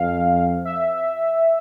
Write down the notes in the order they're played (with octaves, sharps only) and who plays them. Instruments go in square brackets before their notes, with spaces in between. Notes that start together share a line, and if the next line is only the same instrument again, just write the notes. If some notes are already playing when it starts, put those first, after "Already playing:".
Already playing: [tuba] F2 [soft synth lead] F5
[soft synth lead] E5